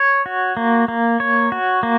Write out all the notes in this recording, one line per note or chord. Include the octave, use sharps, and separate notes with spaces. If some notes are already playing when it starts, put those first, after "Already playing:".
Already playing: C#5
F#4
A#3
A#3
C#5
F#4
A#3